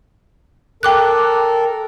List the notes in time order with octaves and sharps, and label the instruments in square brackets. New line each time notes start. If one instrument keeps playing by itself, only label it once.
[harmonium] A4 A#4 [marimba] G5 D6 F#6